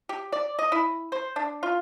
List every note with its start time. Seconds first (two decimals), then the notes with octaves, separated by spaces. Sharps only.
0.09 G4
0.32 D5
0.59 D#5
0.72 E4
1.12 C5
1.36 D4
1.63 F4